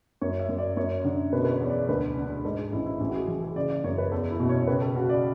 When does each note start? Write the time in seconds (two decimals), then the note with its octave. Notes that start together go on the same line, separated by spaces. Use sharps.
0.21 F#2 C#5
0.40 E5
0.49 F#2
0.58 D5
0.77 F#2 C#5
1.04 D3
1.32 B2 B4
1.45 B4
1.51 C#5
1.60 E2
1.70 D5
1.89 D2 B4
2.17 D3
2.44 G#2 A4
2.58 G#4
2.72 A1 E4
2.86 E4
3.00 A1 E4
3.09 F#4
3.14 G#4
3.28 E3
3.43 G#4
3.56 C#3 D5
3.70 D5
3.84 F#2 C#5
3.98 B4
4.12 E2 A4
4.30 E4
4.40 B2
4.49 C#5
4.67 C#2 B4
4.81 A4
4.96 C#3 F#4
5.09 D5